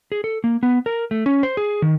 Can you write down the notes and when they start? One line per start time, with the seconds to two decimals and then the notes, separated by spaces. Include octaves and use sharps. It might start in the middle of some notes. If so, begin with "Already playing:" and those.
0.12 G#4
0.24 A4
0.44 A#3
0.63 B3
0.86 A#4
1.11 A3
1.26 C#4
1.43 C5
1.57 G#4
1.82 D#3